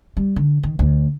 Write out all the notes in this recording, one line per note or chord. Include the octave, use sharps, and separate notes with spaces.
G3
D3
D#3
D2